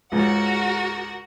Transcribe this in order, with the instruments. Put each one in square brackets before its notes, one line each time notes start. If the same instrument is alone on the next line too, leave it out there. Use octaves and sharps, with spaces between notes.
[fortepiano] C#2 G#2 [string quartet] F#4 A#4 F#5